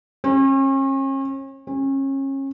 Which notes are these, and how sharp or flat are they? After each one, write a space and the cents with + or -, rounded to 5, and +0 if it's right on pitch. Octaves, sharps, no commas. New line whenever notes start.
C#4 -40
C#4 -30